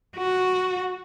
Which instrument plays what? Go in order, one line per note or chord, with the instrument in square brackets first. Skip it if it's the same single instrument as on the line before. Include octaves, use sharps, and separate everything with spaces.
[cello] F#4